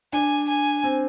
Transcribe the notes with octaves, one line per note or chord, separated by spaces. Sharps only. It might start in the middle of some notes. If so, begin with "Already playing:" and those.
D4 G#5
G#5
C4